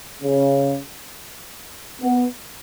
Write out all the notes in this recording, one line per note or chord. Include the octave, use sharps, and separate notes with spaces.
C#3
B3